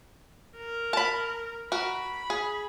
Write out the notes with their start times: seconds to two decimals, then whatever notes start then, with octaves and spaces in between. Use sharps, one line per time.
0.57 A#4
0.93 A5 B5
1.72 F#4 A#4 B5
2.30 G#4